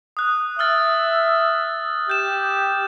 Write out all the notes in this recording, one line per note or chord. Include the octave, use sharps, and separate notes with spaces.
D#6 F#6
E5 E6 F6 A6
G4 G6 E7